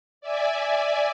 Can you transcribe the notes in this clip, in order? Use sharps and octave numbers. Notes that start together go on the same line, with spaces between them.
D5 E5 G#5